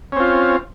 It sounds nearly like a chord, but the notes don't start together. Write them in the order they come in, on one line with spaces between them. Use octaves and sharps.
C#4 C4 F4